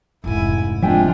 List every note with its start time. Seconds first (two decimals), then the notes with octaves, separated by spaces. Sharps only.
0.24 F1 G#2 E4 G#5
0.82 F3 G#3 C4 D4 F4 E5 G5 G#5